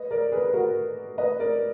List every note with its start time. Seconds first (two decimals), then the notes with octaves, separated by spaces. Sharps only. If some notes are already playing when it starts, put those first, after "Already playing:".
Already playing: B4 D#5
0.11 A#4 D5
0.32 G#4 B4
0.44 B4
0.54 F#4 A#4
1.18 B4 D#5
1.39 A#4 D5